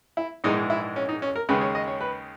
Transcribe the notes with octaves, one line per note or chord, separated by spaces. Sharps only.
E4
A#1 G#2 E3 G#3 D#4
E4
C#4
D#4
C#4
A#4
D#2 C#3 G#3 B4
C#5
D#5
C#5
B4